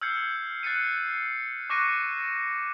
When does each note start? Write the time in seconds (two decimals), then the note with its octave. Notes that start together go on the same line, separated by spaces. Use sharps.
0.01 E6 F6 G6 G#6 C7 C#7
0.63 F#6 A6 C7 C#7 D#7
1.70 C#6 D6 F#6 A#6 C#7 D#7